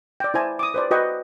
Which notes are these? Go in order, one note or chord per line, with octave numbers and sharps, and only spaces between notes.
D5 G5
E4 C5 G#5 A5
D6 D#6
B4 C5 D5
F#4 B4 D#5 G5 C#6